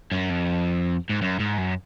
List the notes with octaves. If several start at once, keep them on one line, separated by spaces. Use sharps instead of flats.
F#2
F2
G#2
F#2
G#2
F#2